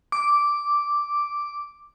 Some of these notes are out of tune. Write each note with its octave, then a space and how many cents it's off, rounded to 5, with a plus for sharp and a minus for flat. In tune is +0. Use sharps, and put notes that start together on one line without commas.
D6 -5